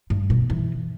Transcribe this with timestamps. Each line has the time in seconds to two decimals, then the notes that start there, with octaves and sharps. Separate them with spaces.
0.10 G2
0.30 B2
0.50 E3